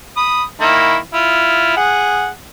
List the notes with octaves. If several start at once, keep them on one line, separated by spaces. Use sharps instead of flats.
B5 D#6
D#3 A#3 E4
E4 F4
G#4 F#5